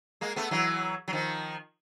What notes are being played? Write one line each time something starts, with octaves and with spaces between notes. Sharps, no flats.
G#3 A#3
A3 B3
E3 F#3
F#3
D#3 F3